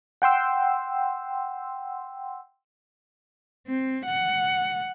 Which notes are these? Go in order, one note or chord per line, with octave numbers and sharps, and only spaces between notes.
F#5 G5 C6 E6
C4
F#5